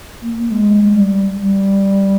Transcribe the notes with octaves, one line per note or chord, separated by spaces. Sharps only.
A#3
A#3
G#3
G#3
G3
G3